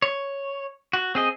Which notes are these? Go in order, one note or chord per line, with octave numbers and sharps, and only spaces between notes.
C#5
F#4
C4 G#4 D#5